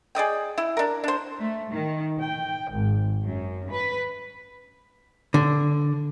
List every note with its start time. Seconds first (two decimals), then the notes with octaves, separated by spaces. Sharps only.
0.15 G#4 D5 D#5 G5
0.58 E4
0.77 D4 A#4
1.04 D4 C5
1.40 A3
1.71 D#3
2.21 G5
2.71 G#1
3.24 F#2
3.71 B4
5.34 D3